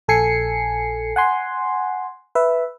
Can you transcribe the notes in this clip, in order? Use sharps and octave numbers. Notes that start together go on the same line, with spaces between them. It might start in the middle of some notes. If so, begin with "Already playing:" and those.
A#1 A4 G#5 C7 C#7
F#5 G#5 C6
B4 E5